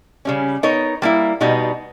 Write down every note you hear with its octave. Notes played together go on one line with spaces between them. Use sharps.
C#3 G3 C#4
B3 D#4 A#4 C#5
G3 A#3 E4
B2 G3 B3 D#4